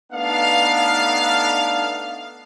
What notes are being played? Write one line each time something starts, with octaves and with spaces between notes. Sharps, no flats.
A3 B3 D4 D#4 F5